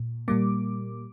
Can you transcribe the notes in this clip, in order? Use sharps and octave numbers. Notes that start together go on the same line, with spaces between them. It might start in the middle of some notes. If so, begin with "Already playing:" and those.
Already playing: A#2
A#2 G3 A#3 D6